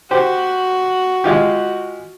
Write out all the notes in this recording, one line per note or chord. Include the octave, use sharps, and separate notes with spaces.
F#4 G4 C5
G#3 F4 G4